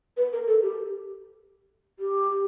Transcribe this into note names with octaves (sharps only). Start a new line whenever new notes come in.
B4
A#4
A4
G4
G4